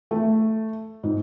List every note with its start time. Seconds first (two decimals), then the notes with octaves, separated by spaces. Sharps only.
0.11 A3
1.03 G#2